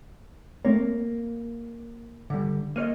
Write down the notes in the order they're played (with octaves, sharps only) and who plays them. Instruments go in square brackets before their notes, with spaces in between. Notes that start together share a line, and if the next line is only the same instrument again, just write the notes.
[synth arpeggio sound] A3 C4 C#5 [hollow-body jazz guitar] A#3
[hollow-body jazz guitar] D3 G3
[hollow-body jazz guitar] A#3 C#5 D#5 [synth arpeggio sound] F6 D#7